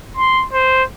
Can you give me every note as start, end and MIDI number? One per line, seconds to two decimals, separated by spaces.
0.17 0.46 84
0.53 0.84 72